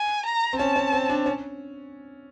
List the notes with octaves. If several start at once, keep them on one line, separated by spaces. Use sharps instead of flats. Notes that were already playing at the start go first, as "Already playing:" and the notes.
Already playing: G#5
A#5
C4
C#4 A5
C#4
C4
D4
C#4